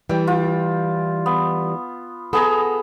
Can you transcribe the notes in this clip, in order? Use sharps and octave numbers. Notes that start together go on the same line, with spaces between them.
E3 G3 G5
F4
B3
B3 G#4 A4 A#5